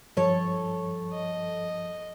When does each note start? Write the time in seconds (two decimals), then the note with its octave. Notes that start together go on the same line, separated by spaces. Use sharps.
0.17 G2 F3 A4 C#5
1.13 D#5